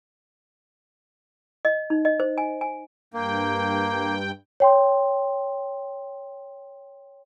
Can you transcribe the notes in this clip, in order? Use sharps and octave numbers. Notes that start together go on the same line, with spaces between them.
D#5
D#4
D#5
C5
G#5
G#5
G2 A#3 G5
C#5 G5 C6